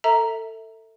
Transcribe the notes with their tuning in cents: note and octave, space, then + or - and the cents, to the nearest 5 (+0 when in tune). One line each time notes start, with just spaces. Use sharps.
A4 +25 E5 -25 A#5 +0